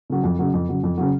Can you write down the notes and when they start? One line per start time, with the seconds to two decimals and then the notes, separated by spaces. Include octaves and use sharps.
0.10 C#3 F#3
0.24 F2
0.39 C#3 F#3
0.54 F2
0.69 C#3 F#3
0.83 F2
0.98 C#3 F#3